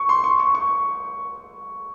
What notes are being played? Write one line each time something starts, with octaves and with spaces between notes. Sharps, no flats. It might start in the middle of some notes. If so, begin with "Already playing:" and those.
Already playing: C#6
C6
C#6
C#6
C#6